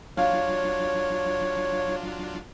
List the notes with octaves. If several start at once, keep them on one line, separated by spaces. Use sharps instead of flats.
F#3 D4 F4 C#5 F5